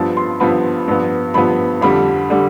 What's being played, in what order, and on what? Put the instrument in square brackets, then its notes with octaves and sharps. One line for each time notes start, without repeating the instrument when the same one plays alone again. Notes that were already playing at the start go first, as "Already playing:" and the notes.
Already playing: [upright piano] G2 F3 B3 A5
C6
G2 F3 B3 B5
G2 F3 B3
G2 F3 B3 B5
F2 D3 G3 B5
D3 G3